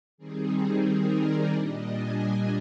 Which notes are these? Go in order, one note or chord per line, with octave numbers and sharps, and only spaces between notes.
D#3 G3 C4 D#4 G#4
A#4
D5
A#2 G3 D4 D#5
G#5